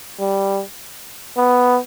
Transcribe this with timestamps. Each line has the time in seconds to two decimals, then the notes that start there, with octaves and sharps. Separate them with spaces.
0.20 G3
1.37 B3